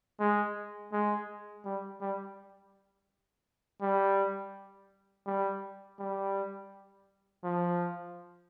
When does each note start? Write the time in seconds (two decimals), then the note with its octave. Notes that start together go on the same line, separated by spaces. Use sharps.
0.20 G#3
0.93 G#3
1.65 G3
2.01 G3
3.82 G3
5.27 G3
5.99 G3
7.44 F3